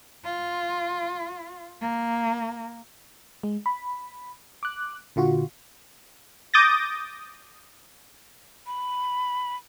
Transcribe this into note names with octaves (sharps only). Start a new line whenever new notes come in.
F4
A#3
G#3
B5
D6 F#6
A#2 D3 F4 F#4
D6 D#6 G6 A6 A#6
B5